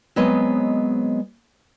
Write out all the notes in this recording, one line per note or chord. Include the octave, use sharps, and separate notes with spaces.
F#3 G#3 B3 C4 C#5 D#5